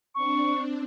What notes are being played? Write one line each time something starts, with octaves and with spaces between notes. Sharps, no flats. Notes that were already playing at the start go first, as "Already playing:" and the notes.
C4 D4 C#6